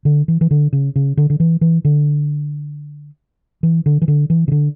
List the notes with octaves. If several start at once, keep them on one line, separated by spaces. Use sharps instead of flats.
D3
E3
E3
D3
C#3
C#3
D3
D3
E3
E3
D3
E3
D3
E3
D3
E3
C#3
D3